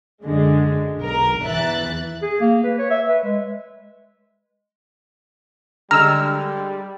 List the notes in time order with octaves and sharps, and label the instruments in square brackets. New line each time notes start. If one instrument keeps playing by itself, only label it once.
[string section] F#2 D3 G#3
B1 A#4
E2 E3 E5 F#6 A6
[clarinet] G#4
A#3
B4
C#5
E5
B4
G#3
[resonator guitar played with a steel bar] D3 G#3 [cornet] G3 [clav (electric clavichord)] A#5 [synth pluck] E6 F6